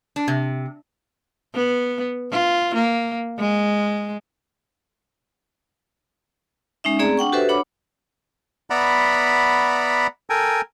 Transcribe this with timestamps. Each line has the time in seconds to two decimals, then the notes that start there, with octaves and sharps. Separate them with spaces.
0.16 D4
0.28 C3
1.54 B3
2.31 F4
2.75 A#3
3.39 G#3
6.84 G#3 C#4 D#4 E5
6.99 A3 C4 G#4 D5 A#5
7.17 D4 F#5 G5 C#6
7.32 F#4 G4 A4 B4 C5 E5
7.49 D4 C#5 F#5 B5 D6
8.70 B3 D5 E5 F#5 A#5 B5
10.30 A4 A#4 G5 G#5